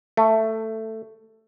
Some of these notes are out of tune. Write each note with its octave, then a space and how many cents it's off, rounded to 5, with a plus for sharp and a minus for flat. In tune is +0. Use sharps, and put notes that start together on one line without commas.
A3 +10